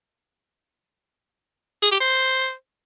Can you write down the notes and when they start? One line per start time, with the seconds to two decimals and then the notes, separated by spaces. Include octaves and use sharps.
1.82 G#4
1.91 G4
2.00 C5